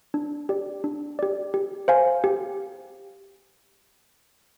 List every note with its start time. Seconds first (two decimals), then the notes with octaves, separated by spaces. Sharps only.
0.14 D4
0.49 G4 D5
0.84 D4
1.19 G4 D5
1.54 G4
1.88 C5 F5 G#5
2.24 G4